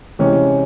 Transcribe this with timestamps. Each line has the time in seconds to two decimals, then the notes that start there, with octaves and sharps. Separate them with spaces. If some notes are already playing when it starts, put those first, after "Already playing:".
0.19 C3 E3 G#3 C#4